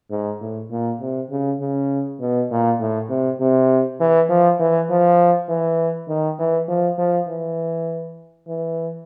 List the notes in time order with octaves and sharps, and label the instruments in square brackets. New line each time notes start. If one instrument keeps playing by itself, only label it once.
[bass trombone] G#2
A2
A#2
C3
C#3
C#3
B2
A#2
A2
C3
C3
E3
F3
E3
F3
E3
D#3
E3
F3
F3
E3
E3